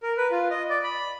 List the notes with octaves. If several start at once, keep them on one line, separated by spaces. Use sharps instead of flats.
A#4
B4
F4
D#5
D5
B5